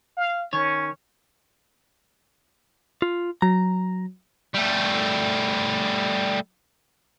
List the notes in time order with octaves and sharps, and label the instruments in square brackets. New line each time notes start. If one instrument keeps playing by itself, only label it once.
[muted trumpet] F5
[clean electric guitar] D#3 C#5 [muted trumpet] C#4
[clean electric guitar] F4
[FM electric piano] F#3 [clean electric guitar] A#5
[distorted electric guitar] G3 A3